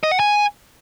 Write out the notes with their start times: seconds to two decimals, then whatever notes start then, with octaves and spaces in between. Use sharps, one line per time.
0.03 D#5
0.11 F#5
0.20 G#5